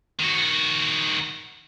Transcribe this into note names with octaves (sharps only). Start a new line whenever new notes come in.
D#3 F#4